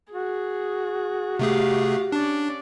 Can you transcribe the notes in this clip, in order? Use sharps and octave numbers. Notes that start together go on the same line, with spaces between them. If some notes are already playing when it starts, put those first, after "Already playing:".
F#4 G#4
C3 A3 G4 G#4 F5
C#4 D4 D5